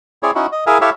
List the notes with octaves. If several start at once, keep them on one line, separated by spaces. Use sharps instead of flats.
C4 E4 G#4 C#5 D5
C#4 D#4 E4 F#4
D#5
E4 G#4 A#4 E5 F5 G#5
E4 G4 A4 C#5 E5 F5